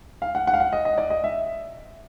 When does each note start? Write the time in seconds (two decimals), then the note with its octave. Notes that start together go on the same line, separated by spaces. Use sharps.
0.22 F5
0.35 F#5
0.47 F#5
0.54 F5
0.60 F#5
0.73 D#5
0.85 D#5
0.98 D5
1.10 D#5
1.24 E5